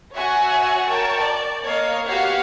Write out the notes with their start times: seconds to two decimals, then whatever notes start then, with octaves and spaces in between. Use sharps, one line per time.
0.14 F#4 C#5 E5 F#5 G#5 C#6
0.88 A#4 C#5 G5 A5 C#6
1.19 D5
1.64 A#3 C#5 D#5 F5
2.06 B3 F#4 G4 C#5 F5 F#5